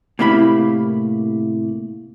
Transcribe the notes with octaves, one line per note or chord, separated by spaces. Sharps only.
A2 C3 A#3 E4 D#5 B5